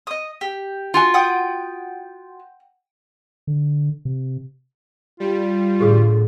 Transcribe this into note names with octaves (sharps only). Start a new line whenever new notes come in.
D#5 D#6
G4
F4 F#4 G#5
F#5 G5 D#6
D3
C3
G3 F4
A2 D3 G4 G#4 D#6